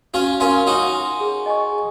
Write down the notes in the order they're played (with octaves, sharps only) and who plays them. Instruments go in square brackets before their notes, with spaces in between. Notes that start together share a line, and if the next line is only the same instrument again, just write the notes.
[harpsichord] C#4 F4 [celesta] F#4
[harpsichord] C#4 F4 [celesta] A#4 F5 C6
[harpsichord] D#4 F#4 [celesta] C#5
[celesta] G#5 C6
G#4
D#5 G#5 C#6
G#4